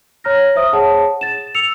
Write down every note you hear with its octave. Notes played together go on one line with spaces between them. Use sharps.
C#5 A#5 F6 A#6
C5 E5 D#6
G#4 C#5 F#5 A5
A6 E7
E6 C#7 F7